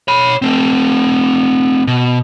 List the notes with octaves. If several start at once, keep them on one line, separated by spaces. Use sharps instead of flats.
C#5 B5
A3 C4
B2